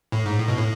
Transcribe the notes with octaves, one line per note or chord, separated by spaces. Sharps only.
A2
G#2
A2
B2
A2